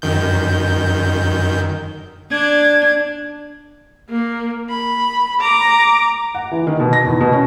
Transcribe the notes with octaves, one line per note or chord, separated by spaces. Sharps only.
F#2 D#3 G6
D4 G#6
A#3
B5
A#5 D6
F#5
E3
D#3
B2
A#6
E2
B2
C#4